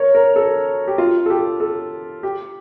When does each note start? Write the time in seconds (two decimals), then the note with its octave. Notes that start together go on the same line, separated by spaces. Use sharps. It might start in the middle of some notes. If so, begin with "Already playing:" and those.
Already playing: A#4 C#5
0.15 A#4
0.36 A4
0.88 G4
0.98 F4
1.26 A4
1.30 G4
1.60 A4
2.23 G4